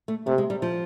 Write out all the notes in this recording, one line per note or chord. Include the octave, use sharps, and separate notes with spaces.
A3
C3 A3
G#3
G3
F3